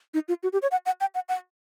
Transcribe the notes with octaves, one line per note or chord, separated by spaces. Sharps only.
D#4
F4
F#4
G4
C#5
F#5
F#5
G5
F#5
F#5